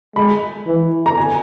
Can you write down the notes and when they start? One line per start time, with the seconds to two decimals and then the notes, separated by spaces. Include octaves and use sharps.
0.16 G#3 B5
0.67 E3
1.06 A#5
1.17 G#5